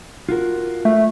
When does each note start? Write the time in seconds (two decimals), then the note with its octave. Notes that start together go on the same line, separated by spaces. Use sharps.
0.29 F4 F#4 A#4
0.85 A3